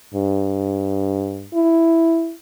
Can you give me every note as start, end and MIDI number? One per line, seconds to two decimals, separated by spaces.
0.14 1.48 43
1.54 2.33 64